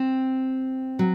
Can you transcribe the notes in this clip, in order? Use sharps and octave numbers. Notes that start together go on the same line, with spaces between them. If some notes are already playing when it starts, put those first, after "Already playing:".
Already playing: C4
F#3